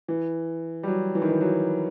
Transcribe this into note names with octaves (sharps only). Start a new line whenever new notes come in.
E3
G3
F#3
E3
D#3
E3
F#3